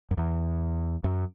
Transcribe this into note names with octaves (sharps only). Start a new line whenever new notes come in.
F#2
E2
F#2